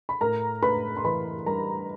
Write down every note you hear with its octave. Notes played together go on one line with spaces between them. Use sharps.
B5
A2 A#4 A#5
A2 B4 B5
C6
E3 B4 B5
G3 A#4 A#5